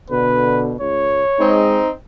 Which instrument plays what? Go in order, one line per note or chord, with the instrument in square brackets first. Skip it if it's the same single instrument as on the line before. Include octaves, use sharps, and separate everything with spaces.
[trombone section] B2 D3 [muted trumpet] B4
[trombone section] C#2 [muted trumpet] C#5
[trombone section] G#3 [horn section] C4 D#4